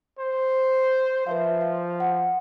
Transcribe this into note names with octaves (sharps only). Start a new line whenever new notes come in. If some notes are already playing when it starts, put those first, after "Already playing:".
C5
F3 B4 E5 F5
F5
F#5